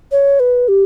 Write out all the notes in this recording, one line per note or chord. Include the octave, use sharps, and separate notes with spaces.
C#5
B4
G4